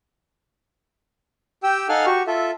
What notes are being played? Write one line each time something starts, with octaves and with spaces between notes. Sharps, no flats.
G4 G5 E6
D#4 A4 F5 F#5 G#5 F6
F#4 G4 C#6
F4 A4 E5